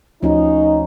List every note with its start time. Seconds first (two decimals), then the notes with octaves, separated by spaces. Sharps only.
0.23 D2 F3 C#4 D#4 F#4